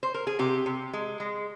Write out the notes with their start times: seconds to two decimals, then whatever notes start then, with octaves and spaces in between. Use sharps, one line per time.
0.03 C5
0.14 A#4
0.27 G#4
0.39 C3 G4
0.66 C3
0.93 G#3
1.20 G#3